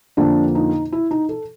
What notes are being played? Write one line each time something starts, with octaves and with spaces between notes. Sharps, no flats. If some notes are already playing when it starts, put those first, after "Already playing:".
F2 D3 F3 A#3 D4
D#4
E4
D#4
A4